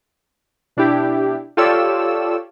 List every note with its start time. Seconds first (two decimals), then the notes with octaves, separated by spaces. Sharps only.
0.77 B2 D4 E4 G4
1.57 F4 G4 A4 C#5 D5 E6